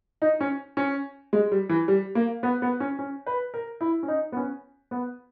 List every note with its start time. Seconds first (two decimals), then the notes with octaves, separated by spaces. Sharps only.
0.22 D#4
0.41 C#4
0.77 C#4
1.33 G#3
1.51 G3
1.69 E3
1.88 G3
2.15 A#3
2.43 B3
2.62 B3
2.80 C#4
2.99 C#4
3.26 B4
3.54 A#4
3.81 E4
4.03 C#4
4.08 D#4
4.32 B3
4.37 C#4
4.91 B3